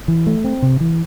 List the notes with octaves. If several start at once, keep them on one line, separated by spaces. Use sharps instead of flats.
E3
A3
C4
C3
E3